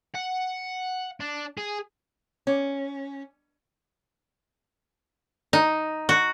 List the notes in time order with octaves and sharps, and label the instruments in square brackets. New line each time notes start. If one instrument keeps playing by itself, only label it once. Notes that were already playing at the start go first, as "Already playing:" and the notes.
[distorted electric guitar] F#5
D4
G#4
[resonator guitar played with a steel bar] C#4
[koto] D#4
F#4